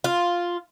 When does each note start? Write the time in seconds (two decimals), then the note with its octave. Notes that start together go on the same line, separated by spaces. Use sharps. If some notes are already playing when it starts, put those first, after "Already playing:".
0.04 F4